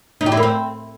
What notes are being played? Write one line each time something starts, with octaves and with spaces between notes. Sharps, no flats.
D#4
G4
E4
A#3
C4